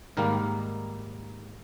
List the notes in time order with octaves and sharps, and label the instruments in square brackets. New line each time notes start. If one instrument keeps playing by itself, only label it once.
[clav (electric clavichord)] G#2 D#3 G3 A#3 A#4